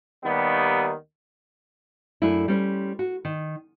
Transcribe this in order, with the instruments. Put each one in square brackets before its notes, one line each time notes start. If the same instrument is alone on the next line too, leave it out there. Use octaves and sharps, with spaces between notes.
[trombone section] D#2 D#3 G3 B3
[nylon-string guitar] F#2 A3 D4 E4
G3 C#4 C5
F#4
D#3